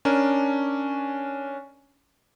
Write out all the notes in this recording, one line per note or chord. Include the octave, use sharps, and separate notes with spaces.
C#4 D4 A#4